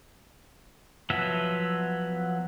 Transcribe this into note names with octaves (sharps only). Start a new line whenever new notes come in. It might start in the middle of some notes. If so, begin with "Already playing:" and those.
F3 F#3 B3 E5